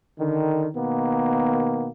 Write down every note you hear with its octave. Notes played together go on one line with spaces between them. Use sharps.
D3 D#3
B2 D#3 A#3 B3